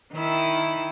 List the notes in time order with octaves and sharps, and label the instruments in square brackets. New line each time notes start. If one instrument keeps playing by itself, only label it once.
[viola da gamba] D#3 E4